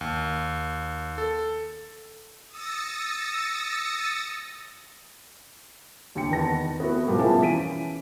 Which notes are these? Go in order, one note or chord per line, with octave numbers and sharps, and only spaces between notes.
D#2
A4
D#6 E6 A6 A#6 C#7
D#2 D3 G5 C#7
E2 D#3 B4 A5 A#6
B3 E4 F#4 B4
B2 F3 G3 A#3 B3
B3 C#4 E4 F4 G#4 A5
E3 C#4 B6 D7 D#7